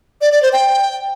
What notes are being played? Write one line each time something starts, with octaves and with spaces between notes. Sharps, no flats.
D5
D5
C5
G5